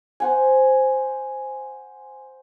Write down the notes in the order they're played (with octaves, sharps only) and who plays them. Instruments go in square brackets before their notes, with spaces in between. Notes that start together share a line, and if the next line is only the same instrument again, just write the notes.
[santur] C5 F#5 G#5